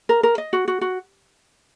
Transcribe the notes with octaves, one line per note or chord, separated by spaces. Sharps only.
A#4
A#4
D#5
F#4
F#4
F#4